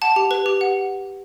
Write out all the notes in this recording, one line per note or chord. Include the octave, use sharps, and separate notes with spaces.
F#5 A5
G4
B4
G4
F#5